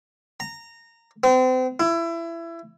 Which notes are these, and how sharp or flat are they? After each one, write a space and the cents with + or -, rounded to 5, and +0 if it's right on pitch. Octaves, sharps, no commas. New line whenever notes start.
A#5 -20
C4 -35
E4 +25